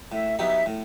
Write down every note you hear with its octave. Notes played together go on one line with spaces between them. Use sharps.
A2 E5
F#3 B3 D#4 G4 E5
A2